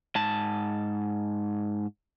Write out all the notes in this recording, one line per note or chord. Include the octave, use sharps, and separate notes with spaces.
G#2 A5